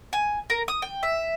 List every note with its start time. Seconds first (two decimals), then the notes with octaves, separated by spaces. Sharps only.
0.13 G#5
0.50 A#4
0.68 D#6
0.82 G5
1.03 E5